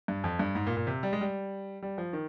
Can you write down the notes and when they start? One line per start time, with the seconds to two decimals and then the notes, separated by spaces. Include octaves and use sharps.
0.08 G2
0.24 F2
0.39 G2
0.55 G#2
0.67 A#2
0.77 A#2
0.87 C3
1.03 G3
1.13 G#3
1.21 G3
1.82 G3
1.98 F3
2.13 D#3